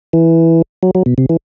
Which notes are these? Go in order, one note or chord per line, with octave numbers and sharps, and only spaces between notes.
E3
F#3
F#3
B2
C3
E3